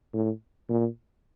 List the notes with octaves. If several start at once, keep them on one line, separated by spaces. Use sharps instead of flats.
A2
A#2